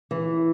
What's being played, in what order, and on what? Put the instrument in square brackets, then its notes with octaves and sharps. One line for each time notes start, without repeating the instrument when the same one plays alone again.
[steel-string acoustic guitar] E3